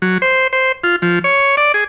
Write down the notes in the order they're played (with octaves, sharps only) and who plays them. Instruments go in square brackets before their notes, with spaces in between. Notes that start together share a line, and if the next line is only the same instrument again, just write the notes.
[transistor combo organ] F#3
C5
C5
F4
F3
C#5
D5
G#4